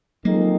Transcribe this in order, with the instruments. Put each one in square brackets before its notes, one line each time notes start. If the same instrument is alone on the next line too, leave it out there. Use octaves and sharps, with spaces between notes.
[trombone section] F2 D#3 G#3 D#4 [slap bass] F#3 A#3